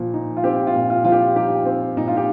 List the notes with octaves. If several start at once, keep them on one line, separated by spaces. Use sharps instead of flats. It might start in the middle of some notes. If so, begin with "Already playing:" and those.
Already playing: A#2 F3
D#4
F4
C4 G4
F4
A#2
F4
F3 F4
G4
D#4 G4
C4
A#2 D#4
F4
G4